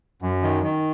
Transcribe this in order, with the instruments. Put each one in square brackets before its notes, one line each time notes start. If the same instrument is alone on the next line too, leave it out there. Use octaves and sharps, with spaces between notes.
[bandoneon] F#2
D#3
D#3